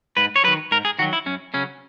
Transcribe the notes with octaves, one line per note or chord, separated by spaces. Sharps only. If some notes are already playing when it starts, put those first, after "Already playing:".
G#2 B4
C#5
D#3 F#3 B4
G#2 A#4
G#4
D#3 F#3 F#4
E4
F#2 C#4
C#3 F#3 C#4